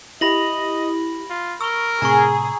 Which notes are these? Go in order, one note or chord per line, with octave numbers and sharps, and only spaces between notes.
E4 G4 D#5 B5 A#6 F#7
F4
A#4 C#6 E6 G7
A2 C3 G#4 A#5 C#6